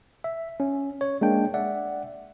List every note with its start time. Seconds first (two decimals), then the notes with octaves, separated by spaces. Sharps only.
0.24 E5
0.60 C#4
1.01 C#5
1.21 G#3 A#3 D4 G5
1.54 D5 E5 F#5